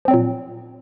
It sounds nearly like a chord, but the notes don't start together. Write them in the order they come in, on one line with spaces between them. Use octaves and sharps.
F3 C4 F#3 A#2